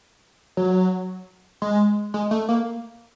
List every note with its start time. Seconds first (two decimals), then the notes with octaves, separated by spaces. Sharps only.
0.57 F#3
1.62 G#3
2.14 G#3
2.31 A3
2.49 A#3